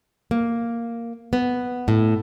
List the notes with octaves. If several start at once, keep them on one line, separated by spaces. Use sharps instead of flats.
A#3
B3
A2